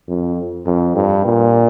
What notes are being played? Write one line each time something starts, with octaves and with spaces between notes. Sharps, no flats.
F2
F2
G2
A#2